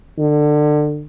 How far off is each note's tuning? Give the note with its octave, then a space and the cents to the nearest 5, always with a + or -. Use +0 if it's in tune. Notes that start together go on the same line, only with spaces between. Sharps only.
D3 +25